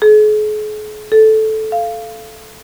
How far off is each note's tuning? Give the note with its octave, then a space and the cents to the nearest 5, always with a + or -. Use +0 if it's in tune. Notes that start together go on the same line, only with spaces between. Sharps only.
G#4 +45
A4 -10
F5 -15